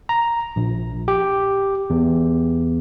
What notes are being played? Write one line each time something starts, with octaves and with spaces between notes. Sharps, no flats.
A#5
A#1
G4
E2